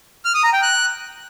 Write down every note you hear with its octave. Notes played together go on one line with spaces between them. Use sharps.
F6
D#6
A#5
G5
F#6